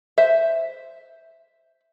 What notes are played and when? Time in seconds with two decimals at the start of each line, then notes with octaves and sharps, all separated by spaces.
0.18 C5 E5